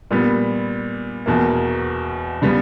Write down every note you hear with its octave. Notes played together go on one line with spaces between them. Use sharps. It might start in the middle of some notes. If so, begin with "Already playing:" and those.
A#2 G3 B3
E2 B2 A#3
C#3 G3 B3